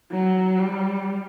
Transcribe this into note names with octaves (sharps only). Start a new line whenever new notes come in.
F#3
G3